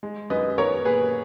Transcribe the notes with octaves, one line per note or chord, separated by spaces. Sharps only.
G#3
F#2 B4 D#5
B3 A#4 C#5
A#2 G#4 B4